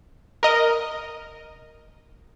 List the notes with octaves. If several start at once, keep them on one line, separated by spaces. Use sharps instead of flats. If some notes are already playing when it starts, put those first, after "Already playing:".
A#4 D#5